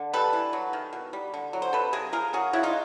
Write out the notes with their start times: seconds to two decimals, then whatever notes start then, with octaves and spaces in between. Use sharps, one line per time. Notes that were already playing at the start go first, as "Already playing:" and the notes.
Already playing: D3
0.13 G3 A4 B4
0.33 E3
0.53 F#3
0.73 D#3
0.93 B2
1.13 G3
1.34 D3
1.53 F#3
1.62 C5
1.73 C3 A4 B4
1.93 C3 G#4 A#4
2.13 F3 G#4 A#4
2.33 C#3 F#4 G#4
2.53 C#3 E4 F#4
2.63 D#4 F4